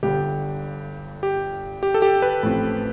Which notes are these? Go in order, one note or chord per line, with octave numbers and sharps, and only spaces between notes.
G1 G2 D3 G4
G4
G4
A4
G4
B4
A1 A2 F3 C4